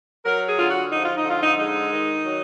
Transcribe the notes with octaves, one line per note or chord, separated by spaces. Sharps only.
F#3 A#4
G#4
D3 F4
F#4
F3 D#4
F4
D#4
D3
F4
D#4
G#3 D#4
D#3
F#3